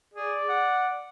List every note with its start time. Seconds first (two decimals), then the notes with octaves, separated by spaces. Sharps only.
0.14 G#4 D5
0.49 F#5